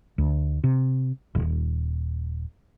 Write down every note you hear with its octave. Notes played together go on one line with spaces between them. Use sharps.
D2
C3
D#1